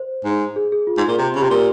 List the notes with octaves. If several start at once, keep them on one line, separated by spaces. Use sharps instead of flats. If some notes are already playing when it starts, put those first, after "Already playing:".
Already playing: C5
G#2
G#4
G#4
F4
G#2
A#2
C3
C#3
C3 G4
A#2 F4